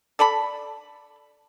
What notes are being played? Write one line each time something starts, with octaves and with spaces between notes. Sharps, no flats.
A4 D5 A5 B5